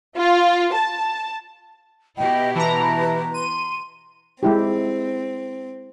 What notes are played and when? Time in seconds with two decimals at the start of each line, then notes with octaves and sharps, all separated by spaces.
0.17 F4
0.74 A5
2.18 B2 E4 G4 D#5 G5
2.55 E3 B4 A5 A#5
3.34 C6 D#7
4.43 G#3 C4 E4 G4